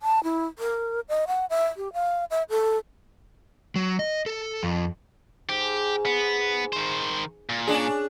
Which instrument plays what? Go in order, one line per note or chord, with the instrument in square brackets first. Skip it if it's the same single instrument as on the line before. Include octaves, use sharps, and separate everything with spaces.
[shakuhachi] A5
E4
A#4
D#5
F#5
E5
G4
F5
E5
A4
[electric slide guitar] F#3
D#5
A4
F2
[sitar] G#2 [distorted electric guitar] G4
[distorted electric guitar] B3
D#3 C5
A#2
[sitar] C#4 D4 G#4